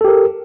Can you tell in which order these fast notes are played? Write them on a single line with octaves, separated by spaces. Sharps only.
A4 G4 A#4